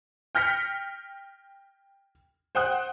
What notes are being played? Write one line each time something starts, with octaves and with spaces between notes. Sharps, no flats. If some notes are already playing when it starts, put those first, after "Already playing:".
G5 F6 G6 A#6 B6 C#7
C5 F#5 G5 D#6 F#6